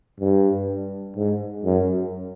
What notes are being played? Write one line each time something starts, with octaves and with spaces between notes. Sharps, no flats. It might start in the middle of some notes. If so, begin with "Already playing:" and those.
G2
G#2
F#2